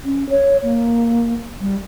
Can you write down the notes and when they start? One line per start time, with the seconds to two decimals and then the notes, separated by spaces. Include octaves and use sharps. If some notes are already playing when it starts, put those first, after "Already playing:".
0.05 C#4
0.29 C#5
0.63 A#3
1.61 G3